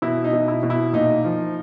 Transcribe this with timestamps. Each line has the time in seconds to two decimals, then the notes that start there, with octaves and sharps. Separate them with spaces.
0.02 B2 E4
0.24 D#4
0.33 B2
0.48 E4
0.63 B2
0.70 E4
0.93 A#2 D#4
1.24 F3